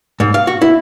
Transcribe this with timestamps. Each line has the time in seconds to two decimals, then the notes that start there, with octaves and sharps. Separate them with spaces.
0.20 G#2
0.34 F5
0.47 F#4
0.62 E4